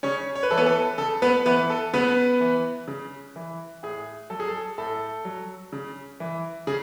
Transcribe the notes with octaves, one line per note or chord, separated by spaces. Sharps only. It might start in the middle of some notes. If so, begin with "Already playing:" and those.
C#3 C#4 C#5
C#5
B4
E3 A4
B3 B4
A4
C#3 A4
B3 B4
E3 B3 B4
A4
C#3 B3 B4
E3
C#3
E3
A2 G#4
F#3 A4
G#4
A4
A2 A4
F#3
C#3
E3
C#3 G#4